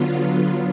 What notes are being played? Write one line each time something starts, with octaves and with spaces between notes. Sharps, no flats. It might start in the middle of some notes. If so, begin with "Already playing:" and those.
Already playing: D3 F#3 B3 F4